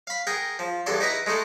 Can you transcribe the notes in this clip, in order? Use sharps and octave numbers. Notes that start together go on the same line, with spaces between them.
F5 B5
G#4 A#4 F#5 G5
F3
E2 G2 A4 D5 C6
D#4 E4 B4 F#5 A#5
G#3 A3 D#4 A4